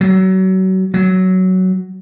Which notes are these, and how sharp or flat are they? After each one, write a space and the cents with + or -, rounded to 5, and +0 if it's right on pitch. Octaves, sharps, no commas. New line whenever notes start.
F#3 +30
F#3 +10